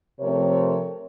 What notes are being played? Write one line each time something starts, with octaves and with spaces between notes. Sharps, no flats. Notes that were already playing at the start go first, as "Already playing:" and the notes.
C3 F3 A3 C4 A#4 C#5